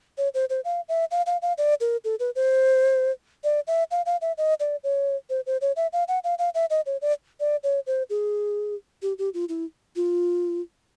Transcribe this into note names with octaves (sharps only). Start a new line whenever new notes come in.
C#5
C5
C5
F5
E5
F5
F5
F5
D5
A#4
A4
B4
C5
D5
E5
F5
F5
E5
D#5
D5
C#5
C5
C5
C#5
E5
F5
F#5
F5
F5
E5
D#5
C#5
D5
D5
C#5
C5
G#4
G4
G4
F4
E4
F4